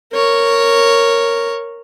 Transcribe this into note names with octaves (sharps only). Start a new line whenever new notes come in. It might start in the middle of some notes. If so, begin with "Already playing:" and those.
A#4 C#5